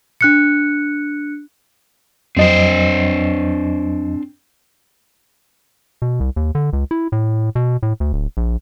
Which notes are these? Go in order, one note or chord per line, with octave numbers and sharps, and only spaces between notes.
D4 F#6 C#7
F2 F#3 C4 D4 C5 D#5
B2
C2
D#2
D3
C#2
E4
A2
B2
A2
D2
D1
A#1